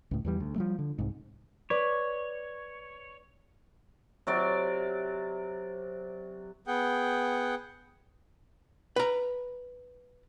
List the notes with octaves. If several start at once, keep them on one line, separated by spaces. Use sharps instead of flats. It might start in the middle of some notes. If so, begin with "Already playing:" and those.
C#2 A2
E2 E3 G3
D2
F3 G3 A3
D3
C2 G#2
B4 C#5 D5
C3 F#3 D5
B3 G#4 F#5 G5
B4 A#5